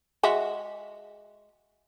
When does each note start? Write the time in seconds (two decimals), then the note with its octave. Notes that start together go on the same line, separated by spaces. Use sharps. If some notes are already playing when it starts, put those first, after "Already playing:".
0.23 G#3 F#4 E5